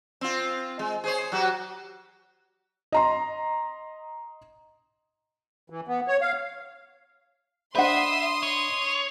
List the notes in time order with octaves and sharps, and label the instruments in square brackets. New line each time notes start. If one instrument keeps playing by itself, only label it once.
[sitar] C4 F4
G#3
G#4 C5 C#5
F#3 F#4 G4
[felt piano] D#5 A#5 C6
[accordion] E3
B3
C#5
F5
[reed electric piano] D4 D#5 B5 [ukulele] C5 F#5 [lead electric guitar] E5 [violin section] C6 D#6
[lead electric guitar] C#5